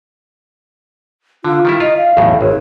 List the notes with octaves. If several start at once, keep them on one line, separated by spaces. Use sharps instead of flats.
D3 F4
D#3 G3 E4
F4 D#5
F5
B1 E2 A2
G#1 C#5